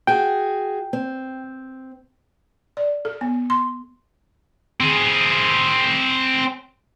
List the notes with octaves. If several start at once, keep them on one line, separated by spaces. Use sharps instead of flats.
F#4 G#4 G5
C4
D5
A4
B3
C6
C4 G#4